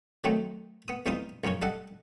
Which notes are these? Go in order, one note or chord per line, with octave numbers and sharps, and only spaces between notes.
D#3 F#3 A3 C4 D#4
B3 D#6
E2 G3 C4 D#4 F4 D#6
A#1 F#2 C#3 C#4 C#5
G3 A4 D#5 F#5